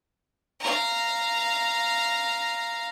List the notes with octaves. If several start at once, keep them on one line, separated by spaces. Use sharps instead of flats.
F5 A#5